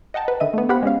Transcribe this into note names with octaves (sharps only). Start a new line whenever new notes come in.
D#5 F#5 G5 A5 A#5
B4
D3 D#3 D#5 E5 D#7
A3 B3
B3 G4 C5 F5 F#5 B5
G#3 B3 C#4 F5